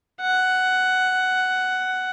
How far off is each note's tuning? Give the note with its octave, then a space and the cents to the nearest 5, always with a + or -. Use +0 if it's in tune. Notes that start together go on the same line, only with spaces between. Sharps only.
F#5 +10